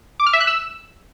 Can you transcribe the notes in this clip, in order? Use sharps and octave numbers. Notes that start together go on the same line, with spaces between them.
D6
F6
E5
F#6
E6